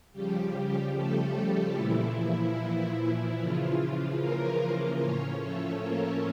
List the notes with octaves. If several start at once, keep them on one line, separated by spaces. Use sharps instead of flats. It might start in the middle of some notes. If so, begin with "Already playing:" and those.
C#3 F3 G3 G4
A3 A4
G3 G4
A#2 E3 F3 E4
C#3 E3 F3 F4
A#3 A#4
A2 F3 C#4 C#5
A3 A4
A#3 A#4